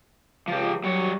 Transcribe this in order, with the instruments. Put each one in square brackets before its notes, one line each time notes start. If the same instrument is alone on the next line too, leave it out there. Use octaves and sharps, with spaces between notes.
[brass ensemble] C#2 [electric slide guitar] F3 G4
[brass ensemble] F#3 [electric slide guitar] G3 C#5